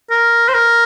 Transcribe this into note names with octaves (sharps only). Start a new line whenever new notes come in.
A#4
C5
A#4